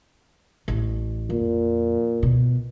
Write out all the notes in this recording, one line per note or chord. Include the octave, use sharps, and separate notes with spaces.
A1
F2 A#2
B2